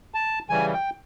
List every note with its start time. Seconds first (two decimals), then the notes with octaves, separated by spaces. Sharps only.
0.14 A5
0.50 C#3 E3 G3 G#5
0.74 G5